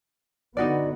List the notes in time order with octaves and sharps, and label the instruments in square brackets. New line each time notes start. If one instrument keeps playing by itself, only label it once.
[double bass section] D3 B3 [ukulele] D#4 F#4 D5